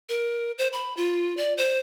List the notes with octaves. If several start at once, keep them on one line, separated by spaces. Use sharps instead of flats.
A#4
C5
B5
F4
D5
C5